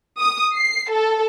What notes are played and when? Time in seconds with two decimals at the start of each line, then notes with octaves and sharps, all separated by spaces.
0.19 D#6
0.54 C7
0.90 A4